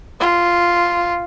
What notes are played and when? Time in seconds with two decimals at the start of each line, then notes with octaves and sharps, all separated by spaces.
0.20 F4